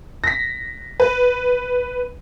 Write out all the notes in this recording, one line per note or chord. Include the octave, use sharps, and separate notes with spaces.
A#6 B6
B4